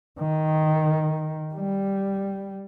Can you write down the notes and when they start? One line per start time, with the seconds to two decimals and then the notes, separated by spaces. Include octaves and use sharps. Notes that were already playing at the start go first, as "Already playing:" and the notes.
0.19 D#3
1.55 G3